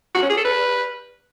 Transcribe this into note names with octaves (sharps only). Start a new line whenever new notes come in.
F#4
C#4
G#4
A4
B4